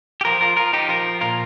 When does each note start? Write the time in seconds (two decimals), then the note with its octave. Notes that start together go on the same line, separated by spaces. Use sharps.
0.21 G4
0.25 F3 F4 A#4
0.41 F4 A#4
0.57 F3 F4 A#4
0.73 D#4 G4
0.89 F3 F4 A#4
1.21 A#2 F4 A#4